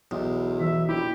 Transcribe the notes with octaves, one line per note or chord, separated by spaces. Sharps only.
B1 E2
E3 E5
A#1 E4 G4